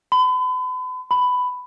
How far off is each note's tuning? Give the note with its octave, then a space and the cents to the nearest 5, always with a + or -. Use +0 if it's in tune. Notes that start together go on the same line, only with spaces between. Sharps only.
B5 +40
B5 +10